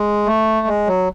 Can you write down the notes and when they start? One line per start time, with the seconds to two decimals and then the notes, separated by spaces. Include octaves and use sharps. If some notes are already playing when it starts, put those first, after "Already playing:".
Already playing: G#3
0.26 A3
0.67 G#3
0.87 F#3